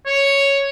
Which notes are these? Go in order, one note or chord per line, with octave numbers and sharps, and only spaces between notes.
C#5